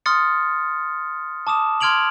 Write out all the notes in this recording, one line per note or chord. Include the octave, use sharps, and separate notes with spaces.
C6 D#6 F6 A6 C#7
A5 D6 D#6 E7
C6 F6 G#6 D7 F7 F#7